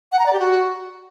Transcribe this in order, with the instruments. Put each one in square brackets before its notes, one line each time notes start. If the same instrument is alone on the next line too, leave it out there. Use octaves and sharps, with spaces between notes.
[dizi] F#5
A#5
D5
G4
F#4